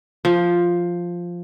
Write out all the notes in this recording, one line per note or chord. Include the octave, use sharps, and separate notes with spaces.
F3